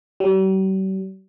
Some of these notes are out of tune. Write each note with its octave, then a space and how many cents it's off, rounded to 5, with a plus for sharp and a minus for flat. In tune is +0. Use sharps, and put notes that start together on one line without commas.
G3 -45